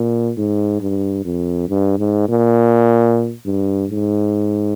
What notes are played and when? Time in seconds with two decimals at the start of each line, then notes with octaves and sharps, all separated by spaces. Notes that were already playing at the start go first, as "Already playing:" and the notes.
Already playing: A#2
0.37 G#2
0.81 G2
1.25 F2
1.69 G2
1.98 G#2
2.28 A#2
3.45 G2
3.90 G#2